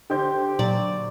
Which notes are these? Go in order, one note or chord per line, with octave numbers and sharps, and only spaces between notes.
D3 G4 C5 G6
A#2 F#3 D5